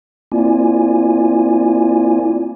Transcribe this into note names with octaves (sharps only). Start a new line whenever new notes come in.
A#3 C4 E4 F4 D5 G#5